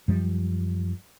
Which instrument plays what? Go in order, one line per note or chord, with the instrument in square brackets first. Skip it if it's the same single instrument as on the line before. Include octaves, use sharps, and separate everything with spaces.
[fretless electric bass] F#2 F3 G3